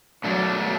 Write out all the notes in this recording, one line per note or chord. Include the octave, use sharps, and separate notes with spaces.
B2 F#3 A3 D4